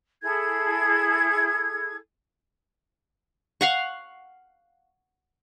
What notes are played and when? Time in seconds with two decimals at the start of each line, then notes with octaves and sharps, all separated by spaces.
0.22 E4 G#4 A4 G#6
3.61 F5 F#5 C#6